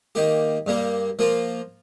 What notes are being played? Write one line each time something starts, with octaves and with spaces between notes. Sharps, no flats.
D#3 A#3 G4
G2 G3 A#3
F3 A#3 F4